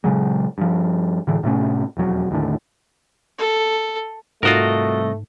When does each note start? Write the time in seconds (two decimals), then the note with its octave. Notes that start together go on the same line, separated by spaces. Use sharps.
0.04 A#2 C#3 F#3 G#3
0.58 G2 F3
1.27 A2 D3 E3
1.43 A2 C3 A3 C#4
1.97 E1 F2 F#3
2.31 D#2 A2 D3
3.38 A4
4.43 C2 G#2 A3 F4 F#4 A#4 D#5